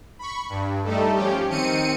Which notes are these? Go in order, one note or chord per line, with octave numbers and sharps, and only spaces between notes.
B5 C#6
G2
G3 A3 D#4 A4
F3 C#4 G4
D#3 C4 C#7 D#7